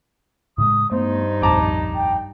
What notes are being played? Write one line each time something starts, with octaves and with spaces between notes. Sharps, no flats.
A2 C#3 G#3 D#6
G2 A3 B3 D#4 C5
D#1 A#1 F2 A5 A#5 D6
G5